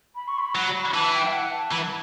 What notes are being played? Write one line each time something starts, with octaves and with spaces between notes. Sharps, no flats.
B5
C#6
B5
F#3
B5
E3 A5
G5
E5
F#5
A5
E3 B5